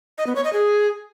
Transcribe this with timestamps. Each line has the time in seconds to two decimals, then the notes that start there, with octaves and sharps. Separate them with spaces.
0.18 D#5
0.27 B3
0.35 C#5
0.44 D#5
0.53 G#4